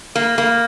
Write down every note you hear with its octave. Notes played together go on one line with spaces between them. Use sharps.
A#3
A#3